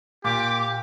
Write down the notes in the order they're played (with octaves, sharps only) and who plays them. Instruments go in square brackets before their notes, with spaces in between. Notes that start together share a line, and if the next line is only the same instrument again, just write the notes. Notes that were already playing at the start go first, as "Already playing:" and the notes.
[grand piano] A#2 [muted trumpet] G4 [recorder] D6